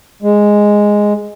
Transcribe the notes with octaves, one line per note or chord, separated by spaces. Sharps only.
G#3